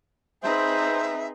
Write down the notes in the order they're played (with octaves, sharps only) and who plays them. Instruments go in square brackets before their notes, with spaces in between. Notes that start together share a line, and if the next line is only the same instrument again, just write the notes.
[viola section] C4 B4 [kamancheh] D#4 G#4 [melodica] C5 [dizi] E5